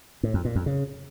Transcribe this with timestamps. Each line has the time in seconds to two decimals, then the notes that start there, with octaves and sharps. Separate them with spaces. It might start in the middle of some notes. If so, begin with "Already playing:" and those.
0.23 A2
0.34 F2
0.45 A#2
0.55 F2
0.66 C#3